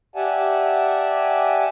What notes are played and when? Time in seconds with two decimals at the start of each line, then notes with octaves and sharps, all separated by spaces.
0.16 G4 D5 E5 F#5 G#5 A5